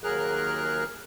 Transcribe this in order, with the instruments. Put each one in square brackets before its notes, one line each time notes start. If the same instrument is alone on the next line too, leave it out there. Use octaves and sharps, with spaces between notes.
[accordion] D#2 F#3 G#4 A#4 F6 F#6